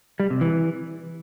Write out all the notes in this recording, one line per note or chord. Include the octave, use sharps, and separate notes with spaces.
G3
C3
E3